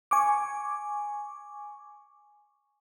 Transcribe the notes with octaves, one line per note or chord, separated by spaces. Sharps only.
G#5 C#6 D6